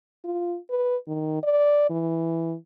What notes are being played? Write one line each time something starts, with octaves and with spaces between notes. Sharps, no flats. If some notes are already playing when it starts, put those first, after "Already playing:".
F4
B4
D#3
D5
E3